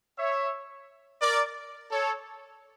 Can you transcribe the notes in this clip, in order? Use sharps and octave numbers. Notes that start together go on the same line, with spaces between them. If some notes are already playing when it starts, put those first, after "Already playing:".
C#5 E5
A#4 D5
A4 C#5